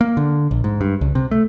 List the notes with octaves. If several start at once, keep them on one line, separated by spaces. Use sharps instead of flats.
A#3
D3
A#1
G#2
G2
C#2
C3
A3